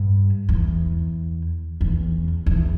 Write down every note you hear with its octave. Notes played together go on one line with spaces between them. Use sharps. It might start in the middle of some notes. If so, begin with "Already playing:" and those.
Already playing: G2
E2
E2
E2